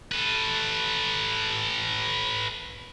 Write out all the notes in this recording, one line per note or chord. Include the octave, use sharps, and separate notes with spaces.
A4 B4